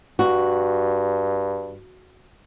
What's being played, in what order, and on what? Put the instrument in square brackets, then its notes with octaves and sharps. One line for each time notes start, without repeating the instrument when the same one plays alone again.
[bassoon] G2 [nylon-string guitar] F#4